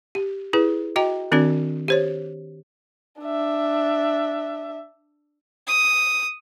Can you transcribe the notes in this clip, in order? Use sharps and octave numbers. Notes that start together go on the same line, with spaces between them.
G4
E4 G#4 B4
F#4 D#5 G5 A#5
D#3 C4 D4 F#4 D5
G4 C5 C#5
D4 E5
D#6